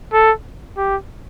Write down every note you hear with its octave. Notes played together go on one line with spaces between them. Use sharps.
A4
G4